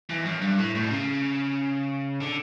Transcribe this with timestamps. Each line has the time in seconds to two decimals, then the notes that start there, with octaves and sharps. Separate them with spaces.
0.09 E2
0.25 F#2
0.41 G2
0.58 A2
0.75 A2
0.84 B2
0.91 C#3
2.21 D3